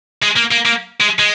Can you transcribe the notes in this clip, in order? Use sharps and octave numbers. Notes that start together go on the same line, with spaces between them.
G#3
A#3
A#3
A#3
G#3
G#3